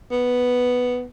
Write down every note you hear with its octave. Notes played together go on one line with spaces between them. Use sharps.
B3